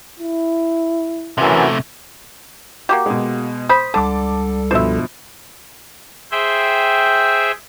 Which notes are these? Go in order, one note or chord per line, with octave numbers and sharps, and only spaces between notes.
E4
F#2 C3 E3 A3
A#3 F#4 G4
B2 G#3
C5 B5 D#6
C#2 D3 G3 A4 A5 D6
G2 B2 F3 C5 E5
G#4 C5 E5 G5